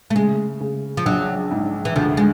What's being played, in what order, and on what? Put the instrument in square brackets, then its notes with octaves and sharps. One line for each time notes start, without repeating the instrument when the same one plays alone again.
[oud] A3
[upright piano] C#3 [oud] G#3
[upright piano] C#3
[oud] F3
[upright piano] A#1 [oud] F#3
[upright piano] G#2
[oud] E3
[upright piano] D2 [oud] F3
[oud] G#3